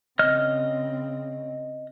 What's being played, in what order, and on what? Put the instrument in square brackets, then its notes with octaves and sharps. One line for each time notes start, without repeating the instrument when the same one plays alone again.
[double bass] C#3 C4 [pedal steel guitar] D#5 F6